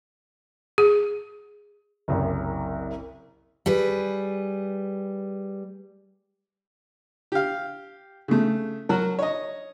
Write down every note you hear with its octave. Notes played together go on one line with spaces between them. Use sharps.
G#4
F#1 C2 F#2
G3 G#4 B4
G4 F5
C#3 A3
F#3 F#4 A#4
C#5 D#5